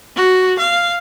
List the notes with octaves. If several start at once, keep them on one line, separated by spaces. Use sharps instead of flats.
F#4
F5